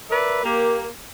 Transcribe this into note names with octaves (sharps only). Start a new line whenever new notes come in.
A#4 B4 D5 E5
A#3 G4